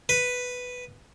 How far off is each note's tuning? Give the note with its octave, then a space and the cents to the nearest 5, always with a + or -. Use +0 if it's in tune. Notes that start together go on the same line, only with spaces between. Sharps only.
B4 +5